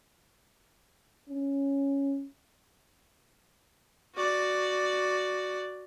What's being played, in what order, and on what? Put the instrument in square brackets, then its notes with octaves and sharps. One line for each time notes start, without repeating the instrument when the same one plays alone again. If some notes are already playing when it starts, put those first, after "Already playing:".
[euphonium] C#4
[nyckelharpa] F#4 D5